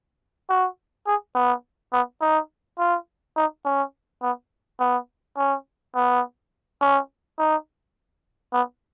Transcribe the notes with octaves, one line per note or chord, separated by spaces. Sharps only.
F#4
G#4
B3
B3
D#4
F4
D#4
C#4
B3
B3
C#4
B3
C#4
D#4
B3